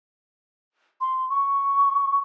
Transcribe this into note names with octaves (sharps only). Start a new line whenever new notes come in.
C6
C#6